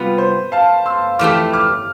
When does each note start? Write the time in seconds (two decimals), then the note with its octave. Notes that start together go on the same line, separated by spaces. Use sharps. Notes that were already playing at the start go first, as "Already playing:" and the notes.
Already playing: C3 G3 B3 F4 B4
0.18 C5
0.52 F5 A5
0.86 C6 E6
1.19 F2 E3 A3 E4 G4 D6 F6
1.53 D6 F6